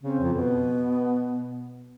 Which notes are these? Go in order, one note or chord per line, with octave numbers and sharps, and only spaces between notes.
C#3 C4
F2
B2 B3